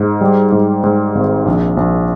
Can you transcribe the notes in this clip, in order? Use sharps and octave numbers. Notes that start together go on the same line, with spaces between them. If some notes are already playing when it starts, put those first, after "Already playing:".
Already playing: G#2
G3
G#2
G#2
G#1
A#1
A#1